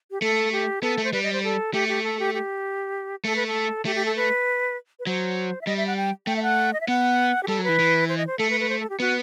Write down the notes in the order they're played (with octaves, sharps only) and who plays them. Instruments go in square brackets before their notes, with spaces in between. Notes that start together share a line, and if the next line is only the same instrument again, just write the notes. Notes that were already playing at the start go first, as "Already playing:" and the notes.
[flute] G4
[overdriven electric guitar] A3 [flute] A4
[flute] G4
[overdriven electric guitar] B3 [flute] A4
[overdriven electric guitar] A3
[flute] C5
[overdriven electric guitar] G3 [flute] B4
[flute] D#5
C5
A4
[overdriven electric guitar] A3 [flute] G4
[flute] G4
A4
G4
G4
[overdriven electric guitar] A3 [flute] A4
[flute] B4
A4
[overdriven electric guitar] A3 [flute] G4
[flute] G4
A4
B4
B4
[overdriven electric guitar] F#3 [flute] C5
[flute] E5
[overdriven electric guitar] G3 [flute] D#5
[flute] E5
F#5
G5
[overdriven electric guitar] A3 [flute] G5
[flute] E5
F#5
D#5
E5
[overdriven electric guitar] B3 [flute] F#5
[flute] G4
[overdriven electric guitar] G3 [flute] A4
[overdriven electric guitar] F#3
[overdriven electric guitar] E3 [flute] B4
[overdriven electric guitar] E3
[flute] C5
D#5
C5
[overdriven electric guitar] A3 [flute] A4
[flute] B4
B4
C5
A4
G4
[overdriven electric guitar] B3 [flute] F#4